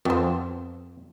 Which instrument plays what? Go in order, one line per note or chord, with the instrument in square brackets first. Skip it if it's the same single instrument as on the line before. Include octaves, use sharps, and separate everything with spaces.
[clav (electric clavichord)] F2 [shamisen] B3 C5